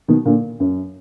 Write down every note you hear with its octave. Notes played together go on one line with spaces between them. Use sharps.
B2 D#3
A#2 D3
F#2